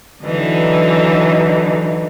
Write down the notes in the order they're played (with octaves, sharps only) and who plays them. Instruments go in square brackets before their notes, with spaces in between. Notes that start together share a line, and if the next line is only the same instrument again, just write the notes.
[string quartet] D3 E3 F#3 D#4